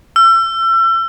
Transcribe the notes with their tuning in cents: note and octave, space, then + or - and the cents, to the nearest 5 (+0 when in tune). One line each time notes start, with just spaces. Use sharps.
E6 +35